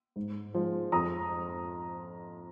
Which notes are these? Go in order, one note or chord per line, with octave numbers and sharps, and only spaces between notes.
G#2
F3 G#3
F2 A#5 D#6